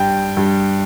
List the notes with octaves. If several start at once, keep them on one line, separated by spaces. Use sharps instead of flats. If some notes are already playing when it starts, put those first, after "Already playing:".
Already playing: G2 G3 G5
G2 G3